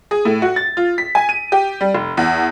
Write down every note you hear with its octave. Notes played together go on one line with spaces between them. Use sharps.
G#4
A2
F#4
A6
F4
B6
G#5
D#7
G4
G3
F1
E2